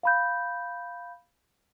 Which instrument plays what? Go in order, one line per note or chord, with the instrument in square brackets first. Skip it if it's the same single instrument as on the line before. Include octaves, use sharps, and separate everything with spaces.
[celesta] F5 B5 G6